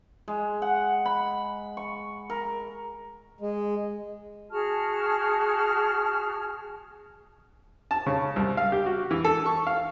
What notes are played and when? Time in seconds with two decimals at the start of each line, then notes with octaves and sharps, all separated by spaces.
0.28 G#3
0.62 F#5
1.05 B5
1.77 C#6
2.30 A#4
3.41 G#3
4.50 F#4 G#4 A5 F6
7.91 A5
8.06 C#3
8.36 C2
8.57 F5
8.72 G4
8.86 F#4
9.11 E3
9.25 A4
9.46 C#6
9.67 F5